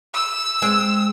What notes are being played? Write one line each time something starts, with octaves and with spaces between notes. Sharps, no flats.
E6
G#3 C4